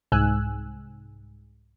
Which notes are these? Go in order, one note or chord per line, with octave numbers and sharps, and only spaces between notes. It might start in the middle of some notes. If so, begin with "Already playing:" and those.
C2 G#2 G#5 E6 F#6